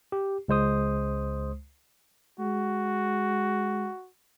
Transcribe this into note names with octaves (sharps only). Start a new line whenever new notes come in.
G4
C#2 G#3 C5 D#6
G#3 F#4